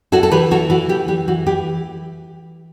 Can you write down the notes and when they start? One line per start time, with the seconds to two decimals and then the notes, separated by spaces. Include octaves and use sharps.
0.12 E4 F#4 A4
0.23 A4
0.31 E3 G4 B4
0.51 E3 F#4 A4
0.70 E3 F#4
0.89 E3 G4
1.08 E3 G4
1.28 E3 F#4
1.46 E3 G4